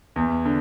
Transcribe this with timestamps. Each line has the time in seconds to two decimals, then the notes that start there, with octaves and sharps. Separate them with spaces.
0.16 E2
0.45 D3